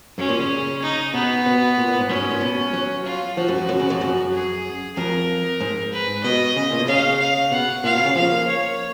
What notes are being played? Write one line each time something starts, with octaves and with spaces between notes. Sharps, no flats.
F#2 C#4
A#2
C#3
D#4
B2 B3
B2
A#2
A#2
G#2
F#2 C#4
G#2
A#2
B2
F#3
F4
F3 F#4
F#2
F2
F#2
C#3
F2
F#2
G#4
F2 A#4
G#2
B4
B2 D#5
C#3
A#2
B2
C#3 F5
F5
B2 F#5
A#2 F5
B2
C#3
F3 F5
A#3
C#5